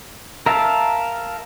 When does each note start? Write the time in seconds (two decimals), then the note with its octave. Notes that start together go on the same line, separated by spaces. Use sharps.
0.46 A#4 E5 F5 A5